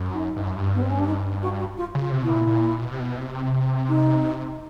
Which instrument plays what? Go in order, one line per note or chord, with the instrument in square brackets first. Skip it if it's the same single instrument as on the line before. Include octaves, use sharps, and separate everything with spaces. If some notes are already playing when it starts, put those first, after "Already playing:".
Already playing: [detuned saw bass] F#2
[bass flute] D#4
[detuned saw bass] G2
F#2
G2
[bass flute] B3
C4
C#4
D4
D#4
F#4
F#4
F4
[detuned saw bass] C#3
[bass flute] F4
[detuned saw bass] C3
[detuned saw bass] B2 [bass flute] E4
[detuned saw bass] A#2
A#2
B2
C3
B2
C3
[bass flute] D#4